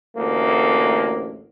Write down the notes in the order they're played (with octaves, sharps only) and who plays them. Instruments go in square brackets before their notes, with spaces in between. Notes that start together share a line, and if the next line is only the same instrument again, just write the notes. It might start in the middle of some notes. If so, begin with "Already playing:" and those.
[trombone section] A1 D2 A#3